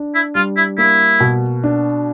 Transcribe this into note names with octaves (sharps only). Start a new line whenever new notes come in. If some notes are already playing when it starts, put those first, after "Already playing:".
Already playing: D4
E4
G3 F4
E4
A#3 E4
B2
D4